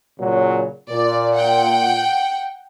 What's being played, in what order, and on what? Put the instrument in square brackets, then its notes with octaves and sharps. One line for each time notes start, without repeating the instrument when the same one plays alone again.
[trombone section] A#2 C#3 F#3
[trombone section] A#2 [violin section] D5
[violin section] F#5 G5